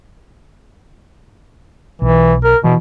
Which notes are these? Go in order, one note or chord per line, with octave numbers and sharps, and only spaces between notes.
B1 E3
A#4
B2 E3